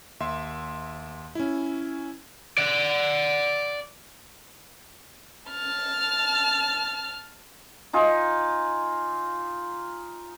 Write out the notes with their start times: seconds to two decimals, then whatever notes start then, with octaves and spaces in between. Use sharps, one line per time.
0.20 D#2 E5 C6
1.35 C#4 E4
2.58 D5 F#5
5.50 A5 F6
7.93 D#4 F4 G#5